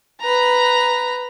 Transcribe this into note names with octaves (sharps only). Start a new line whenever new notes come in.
B4 A#5